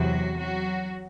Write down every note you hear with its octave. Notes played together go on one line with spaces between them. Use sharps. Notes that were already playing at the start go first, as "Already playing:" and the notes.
Already playing: E2 C3 E3 F#3 F#4
F#3 F#4